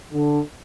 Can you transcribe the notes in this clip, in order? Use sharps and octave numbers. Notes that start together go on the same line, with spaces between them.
D3